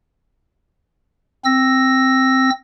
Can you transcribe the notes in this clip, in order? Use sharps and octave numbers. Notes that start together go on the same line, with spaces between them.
C4 E6 A#6